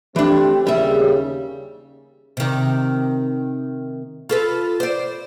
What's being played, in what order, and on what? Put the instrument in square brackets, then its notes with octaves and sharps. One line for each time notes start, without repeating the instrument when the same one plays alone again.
[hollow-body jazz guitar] E3 D4 [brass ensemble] A3 C4 G4
[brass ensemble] D#2 C#3 [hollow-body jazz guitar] G3 E5
[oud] C3 D#3
F4 A4 B4
C5 D5